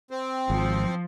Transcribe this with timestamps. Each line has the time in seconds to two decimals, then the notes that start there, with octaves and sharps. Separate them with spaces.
0.11 C4
0.50 G#1 F3